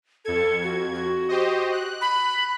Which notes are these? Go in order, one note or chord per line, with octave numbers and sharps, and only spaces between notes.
F2 A4 G#6
F#4
F#4
G4 C5 D#5
F#6
B5